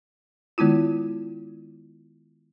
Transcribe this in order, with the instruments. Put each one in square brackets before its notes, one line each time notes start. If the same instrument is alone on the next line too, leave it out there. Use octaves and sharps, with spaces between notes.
[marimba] D#3 G#3 B3 E4 F4